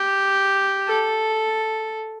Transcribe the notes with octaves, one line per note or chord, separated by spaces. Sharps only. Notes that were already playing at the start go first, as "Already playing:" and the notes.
Already playing: G4
A4